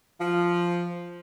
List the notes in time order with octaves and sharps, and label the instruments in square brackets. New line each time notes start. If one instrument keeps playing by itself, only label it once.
[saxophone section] F3